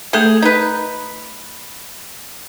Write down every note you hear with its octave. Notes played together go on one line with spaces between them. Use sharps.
A3 G#4 A4 E5
D#4 B4